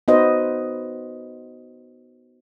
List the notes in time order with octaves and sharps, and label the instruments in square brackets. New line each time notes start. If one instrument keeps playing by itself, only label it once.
[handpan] B3 D#4 F#4 B4 C5 D#5